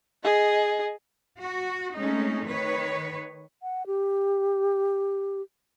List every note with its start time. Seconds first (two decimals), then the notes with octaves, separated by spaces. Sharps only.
0.24 G#4 D#5
1.41 F#4
1.97 G#3 A3 C4 C#4 D#4
2.47 D#3 B4 C#5
3.63 F#5
3.87 G4